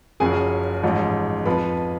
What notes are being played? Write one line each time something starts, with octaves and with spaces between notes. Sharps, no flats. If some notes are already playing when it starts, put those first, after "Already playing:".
F#1 F#2 C#3 F3 G#4 G#5
A1 G#2 F3
F2 F3 B4 B5